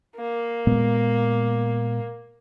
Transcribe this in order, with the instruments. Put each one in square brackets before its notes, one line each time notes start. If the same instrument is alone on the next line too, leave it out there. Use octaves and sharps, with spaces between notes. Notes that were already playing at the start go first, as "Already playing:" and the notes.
[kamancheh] A#3
[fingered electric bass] A#2 G#3 B3